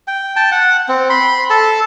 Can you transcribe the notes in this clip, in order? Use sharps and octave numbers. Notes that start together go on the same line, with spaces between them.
G5
G5 A5
F#5
C4
B5 C6
A4 A5